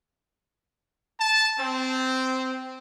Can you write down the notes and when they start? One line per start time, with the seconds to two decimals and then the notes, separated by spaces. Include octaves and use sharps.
1.20 A5
1.59 C4